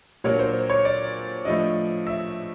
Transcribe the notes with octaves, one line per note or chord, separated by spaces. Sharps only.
A#2 F#3 A#3 D4 C#5
C5
C#5
D5
A2 F3 A3 D4 D#5
E5